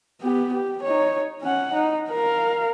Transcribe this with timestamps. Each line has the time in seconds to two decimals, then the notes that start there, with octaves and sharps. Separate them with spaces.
0.22 B3 G4
0.53 G4
0.83 D#4 C#5
1.42 C#4 F#5
1.73 D#4
2.10 A#4 F5